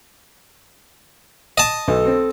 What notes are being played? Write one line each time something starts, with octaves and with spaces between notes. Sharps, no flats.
D#5 A5
B1 A4
C4